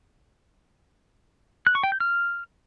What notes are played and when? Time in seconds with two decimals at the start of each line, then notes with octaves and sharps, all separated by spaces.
1.67 F#6
1.75 C#6
1.83 G5
1.92 G6
2.00 F6